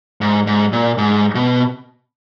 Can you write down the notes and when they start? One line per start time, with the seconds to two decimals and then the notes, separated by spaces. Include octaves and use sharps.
0.21 G#2
0.47 G#2
0.73 A#2
0.98 G#2
1.35 B2